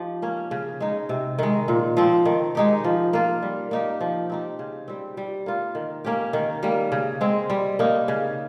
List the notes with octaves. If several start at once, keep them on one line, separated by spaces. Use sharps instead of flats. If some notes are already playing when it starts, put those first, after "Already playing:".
Already playing: F3 D#4 G4
A#3 C#4
C#3
G#3 D#4
C3
D#3 G#3
A#2
F3 C4
D#3
G#3 D#4 G4
F3
A#3 F4
G3
A#3 D#4 G4
F3
C4 D#4 G4
C#3
G3 C4
G3
A#3 F4
D#3
A#3 C#4 G4
D#3
G3 A#3
C#3
G#3 C4
G3
A#3 D#4
C#3